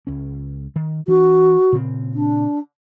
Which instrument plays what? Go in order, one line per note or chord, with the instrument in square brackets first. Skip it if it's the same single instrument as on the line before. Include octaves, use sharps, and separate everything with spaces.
[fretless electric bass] C#2 C#4
D#3
[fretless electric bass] E3 D4 [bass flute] F#4
[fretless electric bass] A#2 C#3 C4
[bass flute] D4